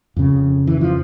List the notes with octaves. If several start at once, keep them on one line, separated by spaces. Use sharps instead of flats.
F2 C#3
E3
F3